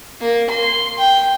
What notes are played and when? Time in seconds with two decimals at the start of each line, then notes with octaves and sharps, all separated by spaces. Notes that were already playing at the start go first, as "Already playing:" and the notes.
0.21 A#3
0.50 C6
0.98 G5